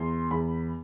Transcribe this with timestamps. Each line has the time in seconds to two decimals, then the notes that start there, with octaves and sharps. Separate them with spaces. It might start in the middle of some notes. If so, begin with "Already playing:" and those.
Already playing: E2 C6
0.31 E2 B5